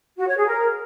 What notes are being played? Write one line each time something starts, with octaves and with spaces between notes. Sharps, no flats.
F#4
C#5
G#4
A#4